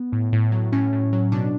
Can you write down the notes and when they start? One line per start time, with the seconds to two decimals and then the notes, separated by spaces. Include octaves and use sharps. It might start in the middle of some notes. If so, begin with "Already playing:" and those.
Already playing: B3
0.12 A2
0.32 A2
0.52 F#3
0.72 A2 C#4
0.93 A2
1.13 F#3
1.32 B2 D4